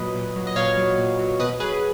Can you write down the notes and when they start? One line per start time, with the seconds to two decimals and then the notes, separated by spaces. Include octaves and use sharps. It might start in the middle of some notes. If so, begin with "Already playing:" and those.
Already playing: A#2 F#3 B4 D#5
0.15 A#2
0.36 F#3
0.47 D#5
0.56 A#2 C#5 F5
0.77 F#3
0.98 A#2
1.19 F#3
1.39 B2 B4 D#5
1.60 F#3 G#4 B4